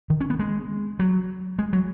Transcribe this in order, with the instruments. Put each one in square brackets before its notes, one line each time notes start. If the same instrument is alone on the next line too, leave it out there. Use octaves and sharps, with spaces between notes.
[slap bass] D#3
C#4
B3
G#3
F#3
G#3
F#3